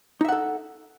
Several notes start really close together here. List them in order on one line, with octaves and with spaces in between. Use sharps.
D#4 E5 F#5 A4